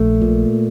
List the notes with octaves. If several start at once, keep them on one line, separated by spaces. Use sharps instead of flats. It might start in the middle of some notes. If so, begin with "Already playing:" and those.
Already playing: A#1 A3
A#2